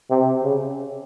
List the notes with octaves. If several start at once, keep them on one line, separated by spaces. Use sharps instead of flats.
C3
C#3